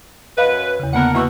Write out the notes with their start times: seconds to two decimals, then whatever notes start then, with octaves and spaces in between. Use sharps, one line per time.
0.38 F#2 F#3 B4 D#5 F5 B5
0.79 E2 C#3
0.93 D3 A#3 B3 D4 A#4 F#5
1.15 B2 E3 A#3 C#6 E6